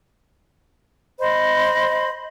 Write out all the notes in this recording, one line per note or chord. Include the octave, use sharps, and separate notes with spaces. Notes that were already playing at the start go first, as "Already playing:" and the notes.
C5 D#5 B5